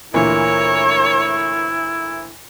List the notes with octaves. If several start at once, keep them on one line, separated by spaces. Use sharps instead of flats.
D2 A#2 E3 E4 A#4 C#5